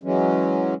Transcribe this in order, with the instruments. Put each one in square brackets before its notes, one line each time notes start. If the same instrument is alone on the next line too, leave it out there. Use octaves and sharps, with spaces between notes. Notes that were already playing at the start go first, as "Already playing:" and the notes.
[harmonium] E3 F#3 G#3 C#4